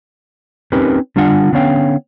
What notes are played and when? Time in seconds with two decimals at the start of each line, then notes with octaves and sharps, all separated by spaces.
0.72 C4 C#4 D#4 G4 A#4 B4
1.16 D3 G3 D4 F4 F#5
1.53 D3 B3 C#4 C#5 F5 G5